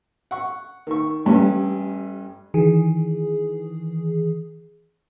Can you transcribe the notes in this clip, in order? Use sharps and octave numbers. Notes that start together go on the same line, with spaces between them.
F#5 C#6
D#3 C#6
A1 G2 C#4
D#3 E3 G#4